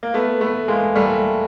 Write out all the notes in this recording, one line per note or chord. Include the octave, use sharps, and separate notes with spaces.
A#3
A3 B3
A3 B3
G#3 A#3
G3 A3